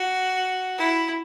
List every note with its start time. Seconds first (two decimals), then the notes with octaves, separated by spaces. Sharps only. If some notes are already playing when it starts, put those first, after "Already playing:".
Already playing: F#4
0.78 E4